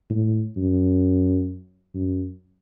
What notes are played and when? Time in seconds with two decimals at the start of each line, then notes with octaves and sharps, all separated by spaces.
0.10 A2
0.57 F#2
1.94 F#2